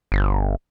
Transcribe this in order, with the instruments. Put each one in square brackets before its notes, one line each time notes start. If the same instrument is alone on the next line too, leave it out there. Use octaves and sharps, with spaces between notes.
[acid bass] G1